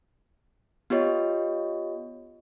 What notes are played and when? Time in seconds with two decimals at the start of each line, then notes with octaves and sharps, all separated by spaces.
0.90 B3 F4 G4 C#5 D#5